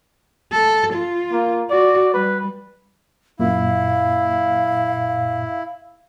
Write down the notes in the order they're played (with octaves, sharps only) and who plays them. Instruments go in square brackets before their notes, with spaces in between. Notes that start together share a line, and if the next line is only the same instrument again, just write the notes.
[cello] A4
F4
[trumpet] A#3
[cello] F#4 [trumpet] D5
[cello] G3 [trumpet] B4
[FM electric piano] F#2 A#2 [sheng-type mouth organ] E4 [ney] F5